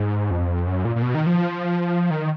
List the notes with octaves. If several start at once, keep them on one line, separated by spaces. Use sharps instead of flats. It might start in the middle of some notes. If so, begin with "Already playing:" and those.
Already playing: G#2
F2
F#2
A#2
A#2
B2
D#3
F3
D#3